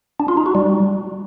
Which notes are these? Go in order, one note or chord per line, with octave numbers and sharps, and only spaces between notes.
D4
F4
D#4
F#4
G3